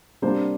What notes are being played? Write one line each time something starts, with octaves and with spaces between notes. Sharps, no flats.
C3 G3 A#3 D4 C5